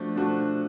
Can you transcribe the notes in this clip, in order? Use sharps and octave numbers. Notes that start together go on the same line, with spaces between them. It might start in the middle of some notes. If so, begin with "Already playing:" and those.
Already playing: F3 A3 D4 F#4
F3 A3 D4 F#4